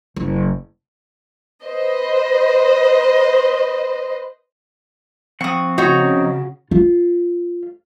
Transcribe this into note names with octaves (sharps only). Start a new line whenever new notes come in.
F#1
B4 C5 D#5
F3 C4 F#5 C#6 D#6
C#3 D#4 F#4 C#5 A#5
F4